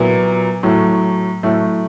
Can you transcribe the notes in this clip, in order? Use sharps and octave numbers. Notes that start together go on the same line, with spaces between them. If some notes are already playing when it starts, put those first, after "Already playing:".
Already playing: A#2 F#3 B3 E4
A2 F#3 A3
A2 F#3 A3